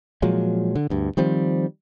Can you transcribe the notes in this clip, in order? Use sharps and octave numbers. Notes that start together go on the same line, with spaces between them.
A#2 F3 F#3 G#3
D3
D2 G2
D#3 F3 G3 C4